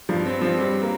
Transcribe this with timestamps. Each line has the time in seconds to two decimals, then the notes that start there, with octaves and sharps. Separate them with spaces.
0.09 G2 F3
0.25 C4
0.41 F3 C4
0.57 G3 C4
0.82 A#3